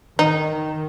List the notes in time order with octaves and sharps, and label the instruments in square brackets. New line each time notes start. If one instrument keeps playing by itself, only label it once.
[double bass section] D#3 [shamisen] D#4